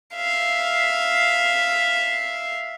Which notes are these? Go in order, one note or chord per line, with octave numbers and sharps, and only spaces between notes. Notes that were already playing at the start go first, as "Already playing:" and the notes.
E5 F5